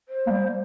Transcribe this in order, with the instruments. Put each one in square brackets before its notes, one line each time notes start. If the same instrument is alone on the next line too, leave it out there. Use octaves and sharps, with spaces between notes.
[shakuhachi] C5
[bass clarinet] A#3
G3